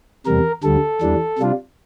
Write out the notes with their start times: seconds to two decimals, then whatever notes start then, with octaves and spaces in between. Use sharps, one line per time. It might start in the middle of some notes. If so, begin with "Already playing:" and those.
0.26 E2 C3 G3 A#4
0.64 D2 D3 G3 A4
1.02 E2 E3 G3 D4
1.39 C3 G3 D4 F4